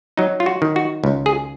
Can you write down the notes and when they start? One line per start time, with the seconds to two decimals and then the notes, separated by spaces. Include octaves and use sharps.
0.17 F#3 D#4
0.40 F4
0.46 F#4
0.62 D#3
0.76 F#4
1.04 C#2
1.26 G#4